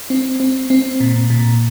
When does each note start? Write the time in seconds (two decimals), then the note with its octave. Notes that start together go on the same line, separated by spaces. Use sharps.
0.10 C4
0.40 C4
0.70 C4
1.00 A#2
1.30 A#2